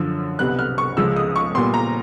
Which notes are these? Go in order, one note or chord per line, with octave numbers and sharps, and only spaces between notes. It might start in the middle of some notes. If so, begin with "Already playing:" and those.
Already playing: F#2 D3 F3 E6
C2 B2 G3 B3 F#6
F6
C#6
C#2 C#3 F3 G#3 E6
D#6
C#6
A#2 G3 B3 C6
A#5